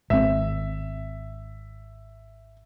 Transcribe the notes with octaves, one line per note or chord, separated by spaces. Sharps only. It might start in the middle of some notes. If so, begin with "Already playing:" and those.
G#1 C4 E5